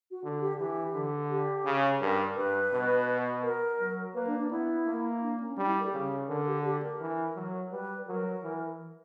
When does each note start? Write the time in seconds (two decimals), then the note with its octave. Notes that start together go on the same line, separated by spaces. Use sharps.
0.11 F#4
0.23 D3
0.41 G4
0.59 E3 G4
0.94 D3
1.30 G4
1.65 C#3
2.01 G2 A#4
2.36 G2 B4
2.73 B2
3.43 A#4
3.80 F#3
4.15 A#3 B4
4.27 D4
4.39 D4
4.50 B3 E4
4.86 A#3
5.22 D4
5.40 C#4
5.57 G3 D4
5.67 E4
5.80 A#4
5.84 G4
5.93 C#3
6.28 D3 A#4
6.46 G4
6.64 G4
6.83 A#4
7.00 E3
7.36 F#3
7.71 G3 B4
8.07 F#3 A#4
8.43 E3